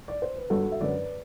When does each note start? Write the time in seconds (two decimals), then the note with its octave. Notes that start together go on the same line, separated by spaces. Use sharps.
0.08 D5
0.22 C5
0.36 B4
0.50 G1 F#4 A4
0.72 E5
0.81 F#2 D3 F#3 B4 D5